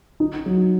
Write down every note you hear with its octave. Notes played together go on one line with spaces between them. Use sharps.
D#4
F#3